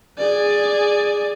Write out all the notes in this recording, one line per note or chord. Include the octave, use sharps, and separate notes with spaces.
G#4 D5